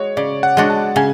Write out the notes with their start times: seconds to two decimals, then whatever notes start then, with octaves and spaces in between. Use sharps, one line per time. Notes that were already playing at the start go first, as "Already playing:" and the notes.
Already playing: G#3 F#4 C#5
0.17 C#3 D5
0.43 F#5
0.57 G#3 D4 F#4
0.70 A5
0.96 C#3 G#5